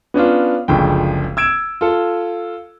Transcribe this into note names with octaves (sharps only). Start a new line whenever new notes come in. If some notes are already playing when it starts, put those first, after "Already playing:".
B3 C#4 D4 F4
F#1 C#2 D3 F3 G5
E6 G#6 D7 E7
F4 A4